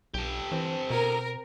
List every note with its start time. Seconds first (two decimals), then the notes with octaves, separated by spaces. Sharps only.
0.14 B1 G4 A4
0.52 E3 C4
0.90 B2 A#4